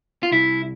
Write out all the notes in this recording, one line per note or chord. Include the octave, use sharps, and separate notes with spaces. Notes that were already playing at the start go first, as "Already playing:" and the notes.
F4
C2 E4